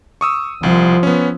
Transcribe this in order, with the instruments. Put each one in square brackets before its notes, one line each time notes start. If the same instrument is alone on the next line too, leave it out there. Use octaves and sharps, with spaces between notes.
[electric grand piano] C#6 D#6 E6
[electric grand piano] C2 [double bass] F3
[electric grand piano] B3 C#4